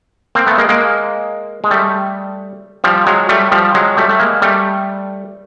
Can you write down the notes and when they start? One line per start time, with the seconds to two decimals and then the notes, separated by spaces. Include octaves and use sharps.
0.35 A#3 C4
0.47 A3 B3
0.58 G#3 A#3
0.69 G#3 A#3
1.64 G#3
1.71 G3 A3
2.84 F3 G3
3.06 F#3 G#3
3.29 G3 A3
3.52 F3 G3
3.74 F#3 G#3
3.97 G3 A3
4.09 A3
4.19 G#3 A#3
4.42 G3 A3